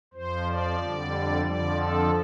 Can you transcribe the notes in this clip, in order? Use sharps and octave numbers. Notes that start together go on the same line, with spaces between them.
F2 F3 C5
D5
F2 D3 G3
F2 D3 F3 D5
A4